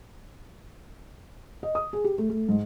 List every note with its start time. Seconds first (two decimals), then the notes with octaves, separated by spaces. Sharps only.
1.63 D#5
1.75 D#6
1.93 G#4
2.05 G4
2.18 A3
2.30 A3
2.49 G#2